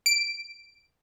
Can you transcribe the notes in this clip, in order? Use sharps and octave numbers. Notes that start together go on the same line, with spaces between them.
D7